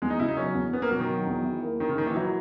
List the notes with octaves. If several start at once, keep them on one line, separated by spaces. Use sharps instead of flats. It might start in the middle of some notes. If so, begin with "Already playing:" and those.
E2 G#3
D#4
C#3 E4
D#4
F#3 C#4
E2
B3 C#4
A#3
B2 F#3
D#3
F#3
E2
E4
A#3
D#3 C#4
C#3
A#2 D#3
E3
F#3 E4